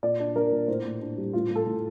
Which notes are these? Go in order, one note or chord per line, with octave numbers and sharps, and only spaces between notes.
A#2 D5
D4
D4 A#4
A#2
A2 C5
A2
D4
G3
A2 F4
A2
A4
A2